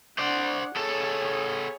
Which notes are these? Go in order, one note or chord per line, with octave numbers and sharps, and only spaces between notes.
D4 C5 D5 F#5
B3 G#4 A4 C#5